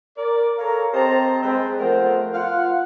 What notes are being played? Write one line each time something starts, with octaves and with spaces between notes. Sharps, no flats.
A#4 D5
A4 A#4 C#5 F5 A#5
C4 G4 C5 D#5 A5 A#5
G#3 C4 B4
F3 A3 B3 A#4 C5
F4 F5 F#5